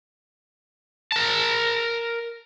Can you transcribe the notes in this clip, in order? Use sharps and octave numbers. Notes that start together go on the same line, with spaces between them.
A#4 A5